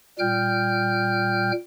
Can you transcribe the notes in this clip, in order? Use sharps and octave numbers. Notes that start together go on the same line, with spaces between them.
A#2 G3 G5 F6 G6